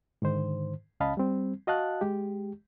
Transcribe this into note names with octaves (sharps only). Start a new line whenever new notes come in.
G#2 D3 D#3 C5
C#2 C#4 D#5 F5 A5 B5
G3 C4
F#4 D#5 F5 A5 F#6
G#3 G4